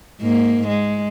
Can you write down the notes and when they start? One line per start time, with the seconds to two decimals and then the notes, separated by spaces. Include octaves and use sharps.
0.21 G#2 A#3
0.68 G#3